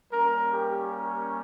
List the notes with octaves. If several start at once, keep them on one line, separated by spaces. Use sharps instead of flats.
G3 A#3 C#4 A#4
G4
A#4